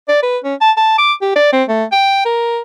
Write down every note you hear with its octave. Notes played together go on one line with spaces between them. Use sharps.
D5
B4
C#4
A5
A5
D6
G4
D5
C4
A3
G5
A#4